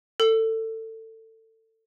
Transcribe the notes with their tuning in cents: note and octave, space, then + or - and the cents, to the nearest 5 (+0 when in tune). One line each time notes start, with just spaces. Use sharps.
A4 +25